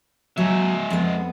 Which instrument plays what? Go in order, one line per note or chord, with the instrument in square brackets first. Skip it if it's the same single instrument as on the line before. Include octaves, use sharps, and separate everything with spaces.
[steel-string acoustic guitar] F#3 [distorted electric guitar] G#3 E5
[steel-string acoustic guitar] F2 B3